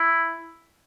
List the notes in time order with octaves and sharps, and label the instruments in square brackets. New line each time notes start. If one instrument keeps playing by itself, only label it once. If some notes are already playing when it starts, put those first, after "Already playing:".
Already playing: [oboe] E4